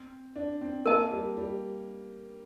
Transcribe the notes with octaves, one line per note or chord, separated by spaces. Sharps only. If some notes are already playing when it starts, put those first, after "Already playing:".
Already playing: C4
D4
C4
A#3 A#4 D#5 A5
G3
G3